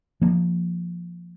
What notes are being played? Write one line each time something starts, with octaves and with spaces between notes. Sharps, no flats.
F3 A#3